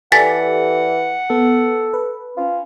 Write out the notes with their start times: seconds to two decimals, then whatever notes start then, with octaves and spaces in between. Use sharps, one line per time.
0.12 E3 G4 A4 D5 F#5 G#5 A6 B6
1.30 B3 A4
1.94 B4
2.37 C#4 F4